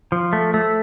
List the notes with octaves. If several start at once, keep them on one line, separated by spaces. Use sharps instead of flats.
F3
A3
A3